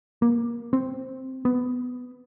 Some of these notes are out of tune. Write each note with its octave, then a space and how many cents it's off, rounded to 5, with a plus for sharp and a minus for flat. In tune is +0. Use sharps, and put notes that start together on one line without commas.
A#3 +20
C4 +0
B3 +10